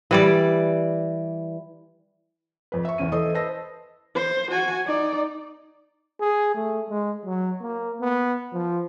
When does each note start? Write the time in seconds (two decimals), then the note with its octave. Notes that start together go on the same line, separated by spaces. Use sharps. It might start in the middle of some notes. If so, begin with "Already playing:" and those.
0.11 E3 G3 D5
2.72 F2 B4
2.85 E5 C#6
2.98 E2 C#4 D#7
3.12 E3 A4 C5 D#5 D#6
3.34 B4 C5 D#5 A5 E6 A#6
4.16 C5
4.51 F#4 G#5
4.85 D#4 D5
6.20 G#4
6.55 A3
6.89 G#3
7.26 F#3
7.61 A#3
8.01 B3
8.53 F3